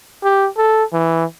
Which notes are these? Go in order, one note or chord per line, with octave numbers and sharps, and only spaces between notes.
G4
A4
E3